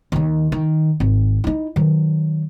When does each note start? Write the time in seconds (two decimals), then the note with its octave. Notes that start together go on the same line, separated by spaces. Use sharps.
0.12 D#2 D#3
0.52 D#3
1.00 G#1 C4
1.44 D#4 E4
1.76 D#3 F#3